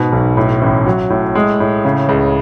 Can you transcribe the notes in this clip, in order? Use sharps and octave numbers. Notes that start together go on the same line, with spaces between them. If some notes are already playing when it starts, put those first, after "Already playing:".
Already playing: G#2 B2
B1
A2
A1
F#3
A2
G#3
A2
C#3
C#2